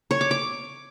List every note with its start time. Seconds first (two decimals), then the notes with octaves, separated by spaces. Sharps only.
0.11 C#5
0.21 D6
0.31 D6